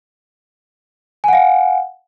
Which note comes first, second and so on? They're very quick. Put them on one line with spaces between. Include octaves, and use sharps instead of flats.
G#5 F#5 F5